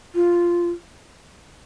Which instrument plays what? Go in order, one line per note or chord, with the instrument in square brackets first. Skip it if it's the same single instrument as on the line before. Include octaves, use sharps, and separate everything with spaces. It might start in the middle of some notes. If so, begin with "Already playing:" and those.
[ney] F4